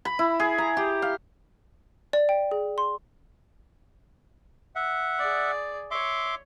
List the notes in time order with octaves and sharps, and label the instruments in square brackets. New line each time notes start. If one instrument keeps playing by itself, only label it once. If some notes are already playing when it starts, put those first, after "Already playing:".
[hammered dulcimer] B5
E4
G#4
A#5
G4
F5
[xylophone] D5
G5
G#4
C6
[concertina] E5 F#5
[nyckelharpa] G#4 D5
[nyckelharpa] C#5 [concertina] E5 C6 D6